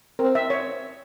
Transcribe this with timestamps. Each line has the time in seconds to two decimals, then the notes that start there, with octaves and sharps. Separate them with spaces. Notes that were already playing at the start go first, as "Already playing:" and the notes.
0.19 C4 A#4
0.35 E5
0.50 C#5